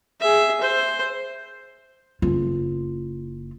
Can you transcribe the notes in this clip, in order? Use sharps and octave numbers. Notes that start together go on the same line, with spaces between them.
G#4 E5
C5
F#1 F4